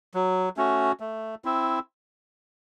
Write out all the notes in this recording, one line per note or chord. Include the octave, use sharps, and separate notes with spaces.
F#3
A3 C#4 F#4
A3
C4 E4